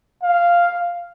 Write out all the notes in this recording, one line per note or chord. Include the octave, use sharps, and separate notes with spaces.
F5